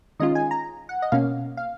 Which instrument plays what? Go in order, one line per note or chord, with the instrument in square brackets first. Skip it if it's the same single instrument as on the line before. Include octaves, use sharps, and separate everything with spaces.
[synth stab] D#3 G#3 C#4 F4 D#5
G#5
A#5
F#5
D#5
B2 A#3 C#4 F5
F5